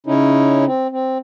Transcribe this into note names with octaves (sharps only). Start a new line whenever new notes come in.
C#3 C#4 D#4 E4
C4
C4